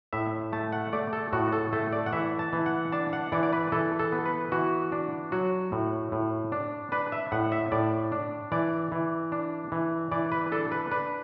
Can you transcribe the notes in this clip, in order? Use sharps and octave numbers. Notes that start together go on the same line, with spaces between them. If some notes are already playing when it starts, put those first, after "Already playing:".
A2 E5
A3 A5
F#5
A3 D5
A4
A2 F#4
A4
A3 A4
D5
F#5
E3 E5
A5
E3
F#5
D4 A5
F#5
E3 D5
D5
B4
E3 A4
A4
B3
B4
E3 F#4
D4
F#3 F#4
A2
A2
D4
D4 B4
E5
A2 F#5
E5
A2 D5
D4
E3 D5
E3
D4
E3
E3 D5
B4
D4 A4
B4
D4 B4